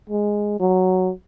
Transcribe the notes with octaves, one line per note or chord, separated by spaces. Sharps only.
G#3
F#3